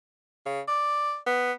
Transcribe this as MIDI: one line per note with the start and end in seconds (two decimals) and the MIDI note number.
0.46 0.60 49
0.68 1.16 74
1.26 1.52 59